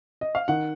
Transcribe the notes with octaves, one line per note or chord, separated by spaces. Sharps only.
D#5
F5
D#3 F#5